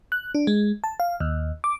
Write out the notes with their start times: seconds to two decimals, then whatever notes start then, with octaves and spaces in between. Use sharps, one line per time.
0.12 F#6
0.35 D4
0.47 G#3
0.84 A5
1.00 F5
1.20 D#2
1.64 D6